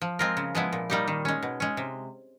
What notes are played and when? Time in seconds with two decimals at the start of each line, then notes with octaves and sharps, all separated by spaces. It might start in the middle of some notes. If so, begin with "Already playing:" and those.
0.02 F3
0.19 G#3 C4 F4 A#4
0.37 C#3
0.55 F3 G#3 B3 E4
0.73 A#2
0.90 G3 A#3 D#4 G4
1.08 D#3
1.25 G#3 C#4
1.43 B2
1.60 G#3 C#4
1.77 C3